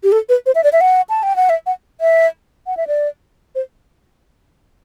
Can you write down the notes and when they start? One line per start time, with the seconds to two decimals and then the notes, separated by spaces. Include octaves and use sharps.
0.03 G4
0.12 A4
0.29 B4
0.46 C5
0.55 E5
0.64 D5
0.73 E5
0.81 F#5
1.09 A5
1.23 G5
1.36 F#5
1.50 E5
1.66 F#5
2.01 E5
2.67 F#5
2.77 E5
2.87 D5
3.55 C5